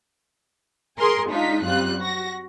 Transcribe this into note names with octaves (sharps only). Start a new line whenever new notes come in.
G#4 A#4 G#5 C6
G#3 D4 D#4 F4 B6
F#2 G3 C4 F4 F#6
F#4 A#6